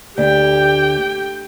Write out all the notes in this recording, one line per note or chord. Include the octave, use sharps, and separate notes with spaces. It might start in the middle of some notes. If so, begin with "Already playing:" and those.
D2 G4 G5